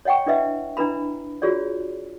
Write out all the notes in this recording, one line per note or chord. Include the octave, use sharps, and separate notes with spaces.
C#5 D#5 F#5 G5 C#6
D4 E4 B4 D#5 E5
D4 E4 B4 A#5 B5
F4 F#4 G#4 C#5 D5